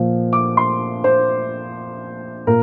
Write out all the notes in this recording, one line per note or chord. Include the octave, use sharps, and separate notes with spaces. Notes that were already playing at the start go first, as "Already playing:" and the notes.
Already playing: A#2 F3
D6
C6
C5
A#2 A#4